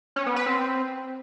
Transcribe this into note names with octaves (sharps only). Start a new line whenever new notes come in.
C#4
B3
B4
C4